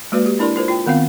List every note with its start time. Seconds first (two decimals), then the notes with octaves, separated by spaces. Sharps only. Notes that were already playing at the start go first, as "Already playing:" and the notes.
0.12 G#3 A#3 F#4 B4 D5
0.26 G4
0.39 D4 E4 A#4 D5 C6
0.56 F4 A#4 C5
0.68 F4 G5
0.86 D#3 B3 C4 F5